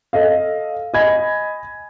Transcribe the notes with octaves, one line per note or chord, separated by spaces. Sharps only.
A4 D#5 F5
D#5 G#5 B5 G#6